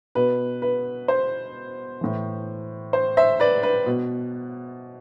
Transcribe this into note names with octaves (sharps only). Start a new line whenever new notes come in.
B2 B4
B4
C5
A2 E3
C5
C5 E5
B4 D5
B4
B2